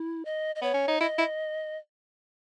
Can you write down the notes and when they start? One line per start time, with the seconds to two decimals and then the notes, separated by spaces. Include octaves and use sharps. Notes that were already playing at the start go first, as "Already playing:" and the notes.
Already playing: E4
0.25 D#5
0.56 D#5
0.62 B3 C#5
0.74 C#4
0.88 D#4
1.00 E4 D#5
1.18 E4